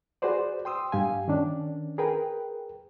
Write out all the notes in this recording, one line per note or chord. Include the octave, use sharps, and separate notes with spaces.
F#4 G#4 B4 C5 D5
G5 C6 D#6 E6
G2 G4 F5 G#5
D#3 C#4 D4
G#4 A#4 B4 G5